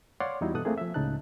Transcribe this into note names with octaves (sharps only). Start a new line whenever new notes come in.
C#5 D5 F5 F#5 C6
E2 G3 D#4 E4 F#4
G2 B2 E3 A4 D#6 F#6
A3 A#3 C4 G#4
F3 E5
C#2 A2 C#3 D#4 A5 F#6